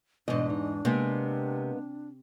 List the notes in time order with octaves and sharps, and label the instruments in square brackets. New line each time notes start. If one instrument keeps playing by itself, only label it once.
[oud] E2 G#2 [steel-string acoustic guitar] B2 D#5 [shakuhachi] D4
[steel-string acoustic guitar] D#4
[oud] C3 [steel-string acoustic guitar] G#3 A#3 B3